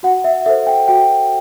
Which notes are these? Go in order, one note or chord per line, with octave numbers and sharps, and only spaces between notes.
F#4 F#5
E5
A4 C5 E5
G5
F#4 G5